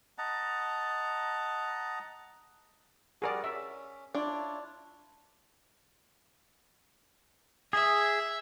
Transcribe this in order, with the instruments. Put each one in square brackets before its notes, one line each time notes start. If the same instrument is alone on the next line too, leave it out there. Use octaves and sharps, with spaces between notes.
[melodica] D#5 F#5 A5 A#5
[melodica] G3 F#4 F#5 [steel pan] G#4 A#4 D5
[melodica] C#4 [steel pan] E5
[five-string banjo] D4 D5 [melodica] E4 F4 C#5
[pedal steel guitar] G#4 [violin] E5